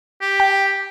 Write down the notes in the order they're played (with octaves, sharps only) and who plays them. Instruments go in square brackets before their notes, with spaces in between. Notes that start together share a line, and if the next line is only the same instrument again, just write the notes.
[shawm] G4
[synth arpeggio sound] G5